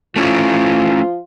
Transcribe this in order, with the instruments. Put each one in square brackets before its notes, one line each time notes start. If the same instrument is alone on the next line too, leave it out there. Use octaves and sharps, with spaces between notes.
[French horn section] F3 F4 [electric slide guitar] A3 C#4 E4